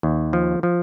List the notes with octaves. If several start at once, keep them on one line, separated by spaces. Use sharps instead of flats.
D#2
F3
F3